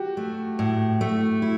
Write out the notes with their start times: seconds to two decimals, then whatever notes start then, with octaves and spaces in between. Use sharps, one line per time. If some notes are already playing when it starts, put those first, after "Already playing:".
Already playing: F#4 G4
0.17 A3
0.59 A2
1.01 A3
1.42 E4